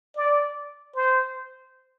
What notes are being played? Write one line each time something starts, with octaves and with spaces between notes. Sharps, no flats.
D5
C5